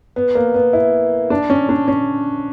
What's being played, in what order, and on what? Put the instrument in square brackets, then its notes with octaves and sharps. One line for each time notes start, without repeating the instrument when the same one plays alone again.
[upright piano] B3
A#3
B3
E4
D4
C#4
D4
C#4